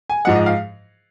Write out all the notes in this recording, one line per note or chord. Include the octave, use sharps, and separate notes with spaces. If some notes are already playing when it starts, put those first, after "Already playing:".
G#5
G#2 F3 G#3 F#5
D#5
F5